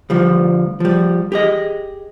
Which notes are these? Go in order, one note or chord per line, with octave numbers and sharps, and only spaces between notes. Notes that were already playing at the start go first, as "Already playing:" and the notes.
D2 F3 G3
F3 G3
G4 G#4 D#5